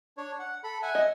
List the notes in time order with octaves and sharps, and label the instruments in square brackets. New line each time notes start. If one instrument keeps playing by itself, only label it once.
[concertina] D4 C#5
F#5
A4 B5
E5 F#5 G#5
[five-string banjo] D#5